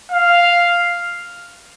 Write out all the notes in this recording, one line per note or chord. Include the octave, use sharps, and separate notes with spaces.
F5